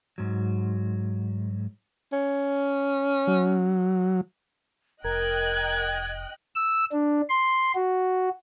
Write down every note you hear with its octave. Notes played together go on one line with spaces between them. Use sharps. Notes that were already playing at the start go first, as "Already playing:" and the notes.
G#2 F#3
C#4
F#3
F1 A#4 D#5 G5 F#6 G#6
E6
D4
C6
F#4